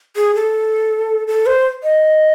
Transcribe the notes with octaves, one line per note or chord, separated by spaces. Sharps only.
G#4
A4
A4
C5
D#5